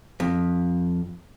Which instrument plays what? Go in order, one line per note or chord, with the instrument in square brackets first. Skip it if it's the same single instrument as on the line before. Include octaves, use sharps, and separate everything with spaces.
[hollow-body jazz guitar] F2